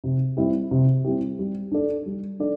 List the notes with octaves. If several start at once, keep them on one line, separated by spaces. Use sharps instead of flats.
C3
G3 C4 E4 G4
C3
G3 C4 E4 G4
G3
D4 A4 D5
G3
D4 A4 D5